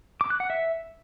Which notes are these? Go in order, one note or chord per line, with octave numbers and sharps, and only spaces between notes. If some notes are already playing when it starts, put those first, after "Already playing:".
D6
F#6
F#5
E5